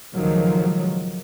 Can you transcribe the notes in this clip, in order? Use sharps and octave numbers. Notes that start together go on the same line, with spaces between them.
C#2 A2 D#3 F3 F#3